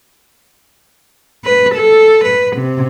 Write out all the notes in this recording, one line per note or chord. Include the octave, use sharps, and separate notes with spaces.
B4
A4
B4
C3